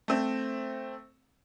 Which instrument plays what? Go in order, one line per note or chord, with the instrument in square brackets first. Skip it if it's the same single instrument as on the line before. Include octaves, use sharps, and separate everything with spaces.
[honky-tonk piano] A3 C4